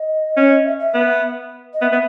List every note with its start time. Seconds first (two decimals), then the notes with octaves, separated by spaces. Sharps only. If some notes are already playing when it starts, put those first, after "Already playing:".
Already playing: D#5
0.37 C#4
0.65 E5
0.80 E5
0.94 B3
1.74 D#5
1.82 B3 E5
1.92 B3